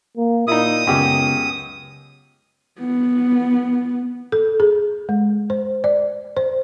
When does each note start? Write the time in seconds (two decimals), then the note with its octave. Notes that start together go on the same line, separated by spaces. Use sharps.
0.17 A#3
0.48 A#2 D#4 E4 D#6
0.87 C#2 F#2 C#3 B3 G4
2.80 B3
4.32 A4
4.60 G#4
5.09 G#3
5.50 C5
5.84 D5
6.37 C5